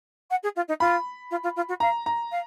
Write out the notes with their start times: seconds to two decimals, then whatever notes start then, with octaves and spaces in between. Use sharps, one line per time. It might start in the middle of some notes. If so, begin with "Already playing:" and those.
0.30 F#5
0.43 G#4
0.56 F4
0.68 D#4
0.80 F4 B5
1.30 F4
1.43 F4
1.56 F4
1.68 F#4
1.80 F5 A#5
2.06 A#5
2.31 F5